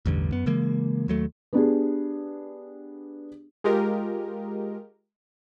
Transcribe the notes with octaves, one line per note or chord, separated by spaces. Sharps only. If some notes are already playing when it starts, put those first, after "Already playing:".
A1 E2 G2 D3
F#2 B3
C#3 E3 G#3 A#3
D#2 F#3 A3
B3 D4 G4 G#4
G#3 F4 G4 A#4 D#5